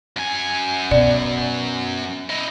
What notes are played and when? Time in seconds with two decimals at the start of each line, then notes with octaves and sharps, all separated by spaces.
0.17 F#2 G#5
0.91 B2 D5
2.30 E4 D#5